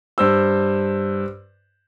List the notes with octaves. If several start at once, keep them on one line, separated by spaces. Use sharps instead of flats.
G2 C5 E6